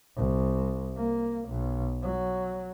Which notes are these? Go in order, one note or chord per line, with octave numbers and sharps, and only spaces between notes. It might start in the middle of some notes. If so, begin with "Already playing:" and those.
C2
A#3
B1
F#3